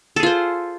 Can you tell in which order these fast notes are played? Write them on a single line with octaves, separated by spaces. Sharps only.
A4 G#4 F4 C5